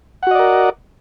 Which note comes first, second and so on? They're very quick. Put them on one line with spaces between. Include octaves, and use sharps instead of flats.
F#5 F#4 D#5 D5 A#4